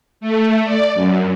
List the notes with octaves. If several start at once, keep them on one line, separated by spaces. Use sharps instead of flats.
A3
D5
F#2